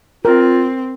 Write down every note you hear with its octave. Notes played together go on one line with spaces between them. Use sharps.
C4 F4 A#4